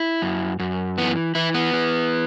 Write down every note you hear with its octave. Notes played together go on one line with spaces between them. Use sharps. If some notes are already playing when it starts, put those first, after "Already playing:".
Already playing: E4
F#2
F#2
E3 B3
E3 E4
B3
E3